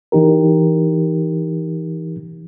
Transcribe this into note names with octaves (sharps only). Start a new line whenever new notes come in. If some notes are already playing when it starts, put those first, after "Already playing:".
E3 D#4 G4 A#4